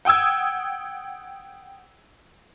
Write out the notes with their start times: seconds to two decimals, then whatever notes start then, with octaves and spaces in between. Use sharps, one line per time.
0.05 F#5 G5 D#6 E6 G#6